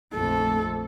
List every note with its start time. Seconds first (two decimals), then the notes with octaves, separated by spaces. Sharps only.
0.14 A#1 F2 A3 A4